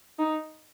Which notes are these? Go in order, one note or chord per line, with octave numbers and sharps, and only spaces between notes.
D#4